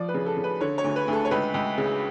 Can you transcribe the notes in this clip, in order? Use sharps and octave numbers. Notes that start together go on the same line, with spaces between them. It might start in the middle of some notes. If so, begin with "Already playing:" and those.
Already playing: F3 D5
B4
C#3
A4
C#3
B4
D3 C#5
C#5
D2
B4
D2
A4
C#5
C#2 B4
C#2
C#3